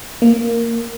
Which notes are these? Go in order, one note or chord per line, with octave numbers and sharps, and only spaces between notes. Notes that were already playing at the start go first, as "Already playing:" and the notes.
A#3